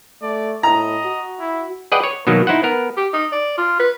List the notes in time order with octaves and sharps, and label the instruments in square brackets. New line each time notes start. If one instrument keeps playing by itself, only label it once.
[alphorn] A3 [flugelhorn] D5
[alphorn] A2 [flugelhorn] D#5 [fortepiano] A#5
[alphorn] F#4
[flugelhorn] E4
[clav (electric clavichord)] G#4 B4 D5 D#5 F#5 G5
C#5
B2 D#3 F#3 A#3
D#4 E4 C5 F#5
B3 A#4
[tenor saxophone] G4
D#4
D5
F4
B4